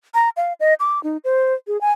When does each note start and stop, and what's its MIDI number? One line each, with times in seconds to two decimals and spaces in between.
0.14 0.29 82
0.37 0.53 77
0.60 0.74 75
0.80 1.02 86
1.04 1.17 63
1.24 1.54 72
1.67 1.80 68
1.81 1.92 80